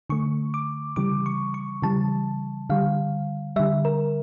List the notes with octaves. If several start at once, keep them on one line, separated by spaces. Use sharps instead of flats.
D3 A3 C#6
D6
C#3 E3 G3 D6
C#6
C#6
C#3 E3 G3 A5
D3 G3 F5
D3 G3 E5
A#4